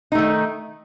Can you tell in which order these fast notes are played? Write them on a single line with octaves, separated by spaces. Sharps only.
D#4 A3 D#3